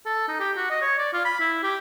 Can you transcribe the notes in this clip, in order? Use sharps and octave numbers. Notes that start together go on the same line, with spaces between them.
A4
D#4
G4
F#4
D#5
C#5
D5
F4
B5
E4
G4